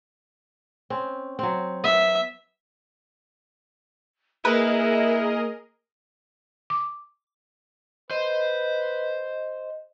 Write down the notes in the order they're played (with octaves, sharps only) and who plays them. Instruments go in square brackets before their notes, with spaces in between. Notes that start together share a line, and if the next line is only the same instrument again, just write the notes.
[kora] C4 C#4
F#3 C4
[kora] B3 [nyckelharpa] E5
[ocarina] A#3 [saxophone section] E4 [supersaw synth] G#4 A#4 D#5 [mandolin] B4
[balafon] D6
[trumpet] B4 [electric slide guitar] C5 [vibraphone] D#5